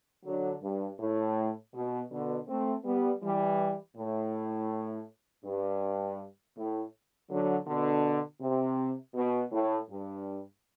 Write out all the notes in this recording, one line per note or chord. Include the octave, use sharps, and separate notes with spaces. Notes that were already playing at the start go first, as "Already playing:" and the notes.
D3 F#3
G2
A2
B2
B2 D3
A3 C4
G3 B3
E3 G3
A2
G2
A2
D3 F#3
B2 D3
C3
B2
A2
G2